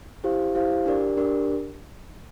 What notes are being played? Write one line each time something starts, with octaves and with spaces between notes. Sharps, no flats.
E4 G4 C5 F5
E4 G4 C5 F5
D4 G4 A#4 D5
D4 G4 A#4 D5